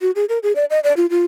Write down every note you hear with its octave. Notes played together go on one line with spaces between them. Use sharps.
F#4
G#4
A#4
G#4
D5
D#5
D5
F4
F4